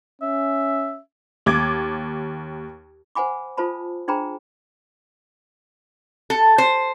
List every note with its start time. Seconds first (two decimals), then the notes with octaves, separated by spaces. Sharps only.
0.22 C#4 E5
1.46 D#2 D6 G#6
3.15 C5 F#5 G#5 B5 D6
3.57 F4 A4 C5 A5 B5
4.08 D4 G#4 C5 G5 A#5 B5
6.30 A4
6.58 C5